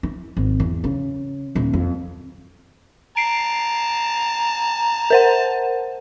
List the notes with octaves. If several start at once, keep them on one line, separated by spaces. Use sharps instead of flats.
E4
G#1
E2
C#3
D#1
F2
A5 A#5 C7 D7
A#4 C5 F#5